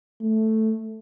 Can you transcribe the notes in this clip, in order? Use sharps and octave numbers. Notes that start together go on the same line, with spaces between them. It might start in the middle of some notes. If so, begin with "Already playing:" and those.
A3